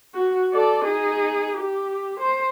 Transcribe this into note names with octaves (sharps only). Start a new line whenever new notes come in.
F#4
A4 D5
D#4 G#4
G4
C5